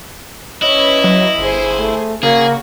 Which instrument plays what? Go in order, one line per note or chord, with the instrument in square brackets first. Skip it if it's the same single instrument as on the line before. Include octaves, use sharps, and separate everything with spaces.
[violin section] C#4 B4 C#5 [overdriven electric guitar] E4 [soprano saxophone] D#5
[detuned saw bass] F#3
[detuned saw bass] G1 [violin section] G#4 C5
[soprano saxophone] A3
[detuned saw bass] C#3 [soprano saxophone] A#3 [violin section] F#4 [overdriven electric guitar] G#4